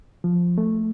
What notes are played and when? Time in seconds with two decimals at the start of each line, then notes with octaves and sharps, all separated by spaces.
0.24 F3
0.58 A3